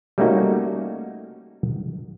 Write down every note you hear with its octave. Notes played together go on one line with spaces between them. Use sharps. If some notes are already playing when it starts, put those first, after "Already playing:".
G3 A3 A#3 C#4 D#4 F#4